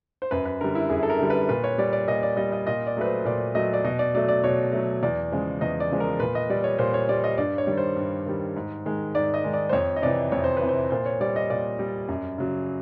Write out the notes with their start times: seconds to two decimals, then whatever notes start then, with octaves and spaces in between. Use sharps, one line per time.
0.22 C5
0.31 F#2 B4
0.45 B4
0.61 D3 G3 A#4
0.75 E4
0.90 F#2 G#4
1.03 A4
1.10 A#4
1.19 D3 G3
1.30 B4
1.49 A#2 B4
1.64 C#5
1.78 G3 D5
1.93 D5
2.08 A#2 D#5
2.23 D5
2.37 G3 D#5
2.52 D#5
2.67 A#2 D#5
2.87 D5
2.97 F#3 A3 B4
3.05 C5
3.25 A#2 D5
3.55 F#3 A3 D#5
3.74 D5
3.84 B2 D#5
3.99 D5
4.15 F#3 A3 D5
4.28 D5
4.44 B2 C#5
4.72 F#3 A3
5.03 E2 D5
5.32 C#3 F3 G#3
5.61 E2 D#5
5.80 D5
5.90 C#3 F3 G#3
6.00 A#4
6.20 A#2 B4
6.35 D#5
6.50 G3 D5
6.64 C#5
6.79 A#2 C5
6.94 C#5
7.09 G3 D5
7.24 D#5
7.38 G2 D5
7.58 C#5
7.67 D#3 G3
7.77 C5
7.96 G2
8.26 D#3 G3
8.56 G#2
8.86 D#3 G#3
9.14 G#2 D5
9.34 D#5
9.44 D#3 G#3
9.54 D5
9.69 C5
9.73 F2 C#5
9.96 D#5
10.02 C3 E3 D5
10.32 F2 C#5
10.44 C5
10.57 B4
10.62 C3 E3
10.69 C5
10.91 A#2 C5
11.06 C#5
11.21 G3 D5
11.36 D#5
11.50 A#2 D5
11.79 G3
12.09 F#2
12.38 C#3 F#3